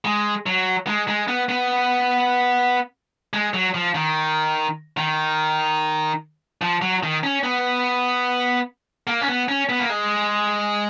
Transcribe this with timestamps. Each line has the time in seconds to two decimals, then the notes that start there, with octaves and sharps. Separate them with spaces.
0.05 G#3
0.46 F#3
0.87 G#3
1.08 G#3
1.28 B3
1.49 B3
3.33 G#3
3.54 F#3
3.75 F3
3.95 D#3
4.97 D#3
6.62 F3
6.82 F#3
7.03 D#3
7.23 C#4
7.43 B3
9.07 A#3
9.21 C#4
9.28 B3
9.48 C#4
9.69 B3
9.80 A#3
9.90 G#3